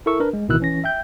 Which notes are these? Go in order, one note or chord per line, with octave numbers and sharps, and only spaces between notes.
E4 A4 A#4 E5 C#6 E6
D4 A#4 B4
G#3
A1 B2 D#3 E4 E6 F#6
E3 C#4 A#6
E5 G5 G6